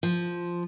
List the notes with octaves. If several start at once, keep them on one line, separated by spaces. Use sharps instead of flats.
F3